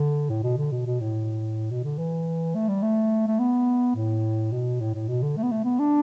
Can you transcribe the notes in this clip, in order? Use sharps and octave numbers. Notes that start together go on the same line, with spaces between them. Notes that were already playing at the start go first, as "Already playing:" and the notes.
Already playing: D3
A2
B2
D3
B2
B2
A2
B2
D3
E3
A3
G3
A3
A3
B3
A2
B2
A2
A2
B2
D3
A3
B3
A3
B3
D4